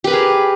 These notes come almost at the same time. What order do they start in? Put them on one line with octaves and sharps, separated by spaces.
G4 B4 A#4 G#4